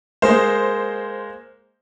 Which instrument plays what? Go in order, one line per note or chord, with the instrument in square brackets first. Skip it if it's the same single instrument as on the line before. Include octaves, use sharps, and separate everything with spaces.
[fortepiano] G#3 A#3 [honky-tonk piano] C5